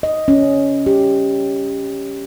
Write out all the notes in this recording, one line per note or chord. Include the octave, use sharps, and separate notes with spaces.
D#5
C#4
G4